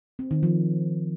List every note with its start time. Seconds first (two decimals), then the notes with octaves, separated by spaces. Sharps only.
0.19 C4
0.31 D#3
0.43 F3